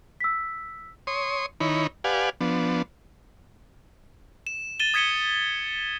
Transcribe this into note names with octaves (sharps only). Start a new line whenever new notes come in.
E6 B6
C#5 C6 D#6
D#3 D#4 E4 C#5 B5
G4 B4 D5 F5 F#5 G#5
F3 B3 D4
E7
A6 D#7 E7 G7
D#6 G#6 B6 C#7 D#7 G7